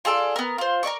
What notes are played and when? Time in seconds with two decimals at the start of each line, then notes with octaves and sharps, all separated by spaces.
0.05 F4 G#4 A4 D5
0.36 B3 A#4
0.58 F4 C5
0.83 A#4 C#5 D5 C#6